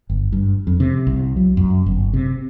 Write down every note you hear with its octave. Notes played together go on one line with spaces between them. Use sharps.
G1
G2
F2
C3
C2
F#3
F#2
G1
C3